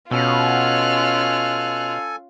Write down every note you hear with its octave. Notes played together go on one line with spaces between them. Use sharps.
B2 C#4 F4 A4 G#5 F6 F#6